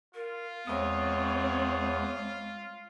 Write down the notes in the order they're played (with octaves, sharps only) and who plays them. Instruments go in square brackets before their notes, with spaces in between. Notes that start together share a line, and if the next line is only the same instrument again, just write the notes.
[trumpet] F4 [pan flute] A#4
[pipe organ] E2 D#6 [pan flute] G#3 [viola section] C4 C#5